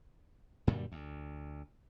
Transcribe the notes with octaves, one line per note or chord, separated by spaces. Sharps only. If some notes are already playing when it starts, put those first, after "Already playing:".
F#2 A#2 D3 G3
D2